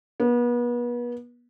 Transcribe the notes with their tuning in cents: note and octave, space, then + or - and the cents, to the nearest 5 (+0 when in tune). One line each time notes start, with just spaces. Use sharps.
B3 -35